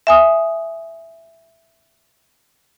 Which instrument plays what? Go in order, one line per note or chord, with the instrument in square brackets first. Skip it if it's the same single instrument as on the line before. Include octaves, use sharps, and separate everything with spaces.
[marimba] E5 G#5 D#6